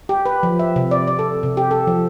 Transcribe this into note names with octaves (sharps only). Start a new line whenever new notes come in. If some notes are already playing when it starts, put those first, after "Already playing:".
G4
B4
F3
E5
C3
D5
D5
A4
C3
G4
A4
F3